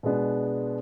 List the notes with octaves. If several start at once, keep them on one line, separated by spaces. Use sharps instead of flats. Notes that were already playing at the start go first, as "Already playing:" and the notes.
B2 G#3 B3 D4